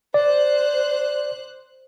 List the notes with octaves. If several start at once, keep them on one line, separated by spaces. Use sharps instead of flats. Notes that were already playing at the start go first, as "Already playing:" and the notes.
C5 D5 F#6